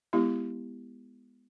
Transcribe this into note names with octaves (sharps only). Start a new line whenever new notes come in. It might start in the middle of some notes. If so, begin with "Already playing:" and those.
G#3 B3 E4 G4